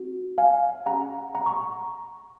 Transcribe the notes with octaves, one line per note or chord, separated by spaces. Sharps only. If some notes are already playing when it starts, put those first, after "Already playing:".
Already playing: C4 D#4 F#4
F5 G#5
C#4 G#4 F#5 A#5
F#5 A#5
A#5 C#6